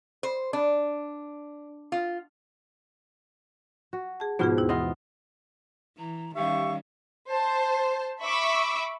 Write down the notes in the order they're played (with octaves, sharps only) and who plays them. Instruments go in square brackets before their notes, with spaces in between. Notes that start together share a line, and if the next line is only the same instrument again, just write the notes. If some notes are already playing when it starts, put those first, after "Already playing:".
[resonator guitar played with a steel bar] C5
D4
F4
[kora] F#4
[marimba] G#4 A5
[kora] G#2 B2 F3 [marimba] B3 F4 G#4
[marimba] D#2 E4
[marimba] E3 [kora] B3 F4 D#5
[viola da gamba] E3 [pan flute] A#5
[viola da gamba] D#3 G3 C#4 [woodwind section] G4 E5 C#6 [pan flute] F5
[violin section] C5 A5
E5 B5 C#6 D6 E6